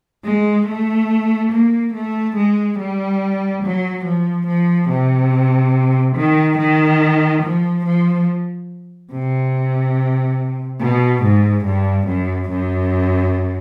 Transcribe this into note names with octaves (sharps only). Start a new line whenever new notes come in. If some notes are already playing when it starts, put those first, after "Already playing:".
G#3
A3
A#3
A3
G#3
G3
F#3
F3
F3
C3
D#3
D#3
F3
F3
C3
B2
G#2
G2
F#2
F#2